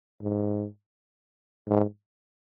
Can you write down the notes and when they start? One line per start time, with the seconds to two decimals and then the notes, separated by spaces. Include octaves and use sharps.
0.22 G#2
1.68 G#2